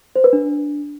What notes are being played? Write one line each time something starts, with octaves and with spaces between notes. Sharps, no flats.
C5
B4
D4